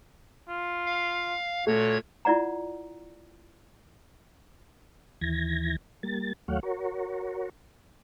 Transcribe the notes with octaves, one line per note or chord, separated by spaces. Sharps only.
F4
F5
A#2 A3 F#4 C#5 G#6
E4 F4 D5 F#5 A#5
D#2 E3 G#6 A#6
G3 A#3 A6
D#2 F#3 A3 C#5 F5 F#5
F#4 A#4 C#5